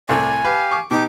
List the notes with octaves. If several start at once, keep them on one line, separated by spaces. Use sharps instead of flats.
C2 A2 C3 D5 G#5
G4 B4 F5
C#6 D6
B2 D#4 G4 D6